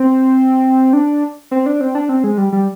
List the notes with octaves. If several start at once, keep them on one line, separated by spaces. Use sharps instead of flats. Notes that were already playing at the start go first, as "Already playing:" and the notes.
Already playing: C4
D4
C4
D4
C4
D4
C4
G#3
G3
G3